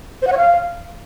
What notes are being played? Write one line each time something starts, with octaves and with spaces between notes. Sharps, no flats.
C5
F#5
C#5
F5